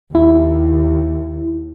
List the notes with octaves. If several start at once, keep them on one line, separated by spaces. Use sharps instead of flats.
D#2 E4